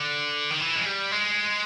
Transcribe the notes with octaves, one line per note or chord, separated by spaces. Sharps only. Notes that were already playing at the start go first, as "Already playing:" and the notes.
Already playing: D3
D#3
E3
G#3
G3
G#3